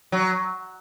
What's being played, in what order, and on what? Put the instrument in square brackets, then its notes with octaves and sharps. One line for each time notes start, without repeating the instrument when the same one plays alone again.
[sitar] F#3